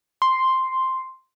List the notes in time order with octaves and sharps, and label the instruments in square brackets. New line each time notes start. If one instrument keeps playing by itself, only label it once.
[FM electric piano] C6